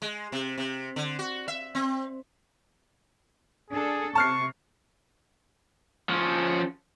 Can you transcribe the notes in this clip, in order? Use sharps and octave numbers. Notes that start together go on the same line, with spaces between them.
G#3
C3
C3
D3
F#4
E5
C4
D4 G#4 A4
C3 A5 C#6 F6 C7
F3 C#4